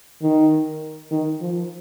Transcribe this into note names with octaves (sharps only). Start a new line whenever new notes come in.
D#3
D#3
F3